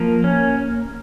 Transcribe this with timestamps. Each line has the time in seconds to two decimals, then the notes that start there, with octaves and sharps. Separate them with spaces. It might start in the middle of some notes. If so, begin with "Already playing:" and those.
Already playing: F3 A#3 A#4
0.24 C#4